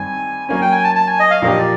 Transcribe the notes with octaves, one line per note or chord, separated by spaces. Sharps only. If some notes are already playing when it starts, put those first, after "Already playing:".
Already playing: G2 D#3 G3 C4 G#5
F#3 A#3 C#4 G#5
G5
G#5
A5
A5
G#5
D#5
F5
A#2 F3 A#3 D4 G4 D#5
D5